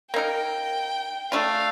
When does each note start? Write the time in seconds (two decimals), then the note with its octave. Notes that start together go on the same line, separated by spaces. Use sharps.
0.14 A#3 D#4 A#4 G5
1.32 A3 D4 F4 F5